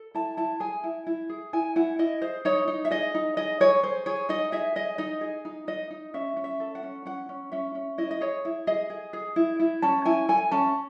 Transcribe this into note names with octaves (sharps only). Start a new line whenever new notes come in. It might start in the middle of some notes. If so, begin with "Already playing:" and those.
Already playing: A4
E4 A5
E4 A5
G#4 G#5
E4
E4
G#4
E4 G#5
E4 F#5
E4 D#5
G#4 C5
D#4 C#5
D#4
E5
G#4 D#5
D#4
G#4 D#5
G#4 C#5
G#4 C5
G#4 C#5
D#4 D#5
G#4 E5
G#4 D#5
D#4 D#5
G#4
D#4
D#4 D#5
D#4
C#4 E5
C#4
E5
A4
F#5
C#4
C#4 F#5
C#4
C#4 E5
C#4
E4 D#5
D#5
G#4 C#5
E4
G#4 D#5
G#4
G#4
E4
E4
C#4 A5
E4 G#5
A4 G#5
C#4 A5